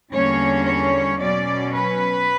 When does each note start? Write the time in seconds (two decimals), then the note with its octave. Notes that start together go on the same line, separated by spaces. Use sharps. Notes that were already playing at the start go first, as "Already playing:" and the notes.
0.13 E2 D3 G3 A#3 C#4 C#5
0.66 C#5
1.20 B2 F#3 C#4 D5
1.73 B4